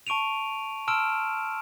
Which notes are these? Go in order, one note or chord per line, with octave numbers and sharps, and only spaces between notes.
A5 C#6 D7 D#7 F7
A5 C6 E6 F6 D7 E7